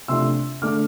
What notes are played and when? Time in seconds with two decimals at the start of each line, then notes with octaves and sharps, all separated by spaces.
0.08 C3 F3 A3 D4 C6 E6
0.62 D3 A3 D4 D6 F6